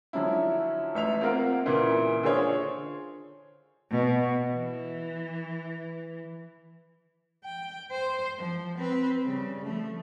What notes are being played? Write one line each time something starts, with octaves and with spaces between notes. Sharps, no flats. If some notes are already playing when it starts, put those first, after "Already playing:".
D3 F3 F#3 C#4 E4
A1 E5 F7
A#3 C4 F4 A#4 F5 F#5
A#2 C#3 E3
D3 F4 G#4 C5 C#5
B2
E3
G5
C5
F3
C4 B4
C#3 G3
F3 A3